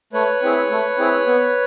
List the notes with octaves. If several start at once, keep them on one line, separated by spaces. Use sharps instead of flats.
A3 B4 C#5
C4 E4 G#4
A3
C4 E4 G#4
B3